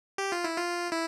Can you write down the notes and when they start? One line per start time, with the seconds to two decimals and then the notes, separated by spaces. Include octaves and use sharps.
0.18 G4
0.32 F4
0.44 E4
0.57 F4
0.92 E4